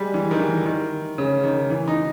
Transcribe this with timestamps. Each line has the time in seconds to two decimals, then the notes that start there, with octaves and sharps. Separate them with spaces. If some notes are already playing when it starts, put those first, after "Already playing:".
Already playing: G3 G#3
0.14 E3
0.31 D#3
0.39 E3
0.66 D#3
1.18 C#3
1.43 D#3
1.70 E3
1.88 D#4